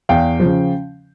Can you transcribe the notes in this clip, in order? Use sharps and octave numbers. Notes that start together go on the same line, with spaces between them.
E2 F5 G5
C#3 F3